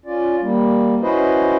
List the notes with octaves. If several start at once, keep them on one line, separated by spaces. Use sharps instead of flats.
C#4 F4 D5
G3 A#3
C#4 E4 F#4 B4 C5 D#5